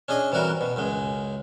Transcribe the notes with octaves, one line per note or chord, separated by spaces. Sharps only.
C#4 D4 G#4 D#5
C3 E3 G3 F#4 A#4
B2
C#2 F#2 G#3